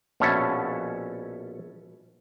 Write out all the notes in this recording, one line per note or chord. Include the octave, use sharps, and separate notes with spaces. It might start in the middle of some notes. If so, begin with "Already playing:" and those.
A#1 B2 C#4 A4 C#5 E5